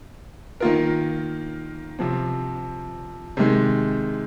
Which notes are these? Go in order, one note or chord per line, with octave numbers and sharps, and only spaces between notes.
D#3 A#3 F4 A#4
C3 F3 C4
C3 D#3 G#3